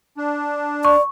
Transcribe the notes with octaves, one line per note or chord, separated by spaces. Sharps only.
D4
D5 C#6